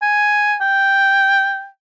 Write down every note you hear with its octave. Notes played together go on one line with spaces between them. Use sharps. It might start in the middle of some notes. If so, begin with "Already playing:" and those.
G#5
G5